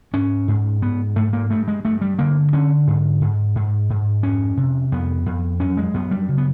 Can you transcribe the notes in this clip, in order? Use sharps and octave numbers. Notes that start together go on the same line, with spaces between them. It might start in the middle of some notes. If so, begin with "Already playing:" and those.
G#2 C#4
G#2
G#2 B3
G#2 A3
A#3
G2 A3
G#3
G2 A3
G3
D3 A#3
D3 C#4
G#2
G#2
G#2
G#2
F2 C#4
C3
F2 B3
F2
F#2 C#4
G#3
F#2 B3
G3
C#3
B3